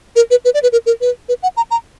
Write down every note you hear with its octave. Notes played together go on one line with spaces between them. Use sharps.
A#4
B4
B4
D5
B4
A#4
A#4
B4
B4
F#5
A#5
A#5